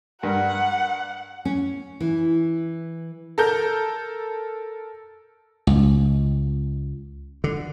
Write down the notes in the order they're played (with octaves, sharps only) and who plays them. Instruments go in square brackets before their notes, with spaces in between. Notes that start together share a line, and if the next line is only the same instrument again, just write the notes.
[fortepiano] G2 A#4 [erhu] F#5
[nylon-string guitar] C#4
E3
[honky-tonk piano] A4 A#4 G6
[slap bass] C#2
D3